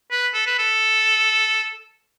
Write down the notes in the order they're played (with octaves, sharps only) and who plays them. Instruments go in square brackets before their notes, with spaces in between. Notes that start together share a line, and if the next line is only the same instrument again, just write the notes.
[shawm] B4
A4
B4
A4